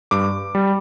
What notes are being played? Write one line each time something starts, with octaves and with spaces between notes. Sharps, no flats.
G2 D6
G3